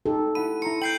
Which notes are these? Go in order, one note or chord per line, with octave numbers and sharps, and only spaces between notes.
D#4 G4 A4
E4 F#5 B5 D#7
E4 A#5 C6 C#7
G5 G6 C7 F#7